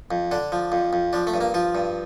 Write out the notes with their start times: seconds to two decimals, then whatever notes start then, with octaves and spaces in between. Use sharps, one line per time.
0.11 F2
0.31 D3 D4
0.52 F3
0.72 F2
0.93 F2
1.13 F3 D4
1.27 A3
1.34 G2
1.41 A#3
1.54 F3 F4
1.75 G2